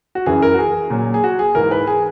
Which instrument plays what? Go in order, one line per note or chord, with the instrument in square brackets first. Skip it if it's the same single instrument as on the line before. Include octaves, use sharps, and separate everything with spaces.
[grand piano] F#4
F#2 E3 G#4
A#4
F#4
G#4
A#2 F#3
G#4
F#4
G#4
G#2 E3 A#4
B4
G#4